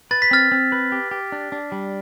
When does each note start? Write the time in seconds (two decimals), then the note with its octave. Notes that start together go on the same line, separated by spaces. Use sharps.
0.11 B4 A6
0.22 B6
0.31 C4 F6 A6
0.52 C4
0.72 B4
0.92 G4
1.11 G4
1.32 D4
1.52 D4
1.72 G3